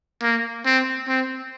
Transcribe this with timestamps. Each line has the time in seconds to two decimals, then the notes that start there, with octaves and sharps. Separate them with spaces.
0.22 A#3
0.66 C4
1.08 C4